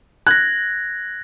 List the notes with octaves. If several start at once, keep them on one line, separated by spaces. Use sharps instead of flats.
F#6 G#6 A#6